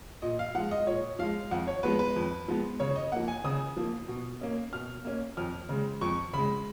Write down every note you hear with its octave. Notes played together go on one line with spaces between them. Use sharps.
A#2 D#5
F5
F3 G#3 F#5
D#5
A#2 C#5
F3 G#3 F5
F2 F#5
C#5
F3 G#3 B3 B4
B4
F2
F3 G#3 B3
C#3 C#5
D#5
F3 A#3 F#5
G#5
C#3 D#6
F3 A#3
B2
A#3 C#4
B2 F6
A#3 C#4
F2 F6
C#3 G#3
F2 C#6
C#3 G#3 B5